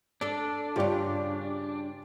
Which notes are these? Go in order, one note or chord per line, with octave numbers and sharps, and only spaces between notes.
D4 A4 D5
G2 C#3 F4 G4 D5